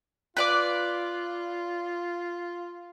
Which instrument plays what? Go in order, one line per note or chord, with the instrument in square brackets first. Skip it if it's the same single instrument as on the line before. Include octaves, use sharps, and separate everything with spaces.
[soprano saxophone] F4 [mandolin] B4 D5 D6